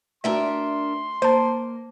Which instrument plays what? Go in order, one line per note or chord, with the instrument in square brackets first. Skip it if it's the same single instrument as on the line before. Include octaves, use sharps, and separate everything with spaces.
[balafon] A3 F#4 [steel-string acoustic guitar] D4 A#4 E5 [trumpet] C6
[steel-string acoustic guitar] A#3 [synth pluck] C5 A5